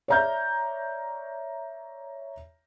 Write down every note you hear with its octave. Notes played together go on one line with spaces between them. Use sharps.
C#5 D5 E5 A#5 F6 G6